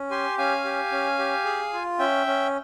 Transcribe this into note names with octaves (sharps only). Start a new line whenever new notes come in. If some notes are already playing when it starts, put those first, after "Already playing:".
Already playing: C#4
G4 G#5 C6
C#4 F5 G#5
G4
C#4
G4
G#4
F4
C#4 E5 G5
C#4